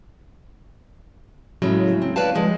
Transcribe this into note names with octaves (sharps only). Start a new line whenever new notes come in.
A2 C#3 F#3 G#3 A3
C4
B4 C#5 D5 F5 G5 A5
F3 G#3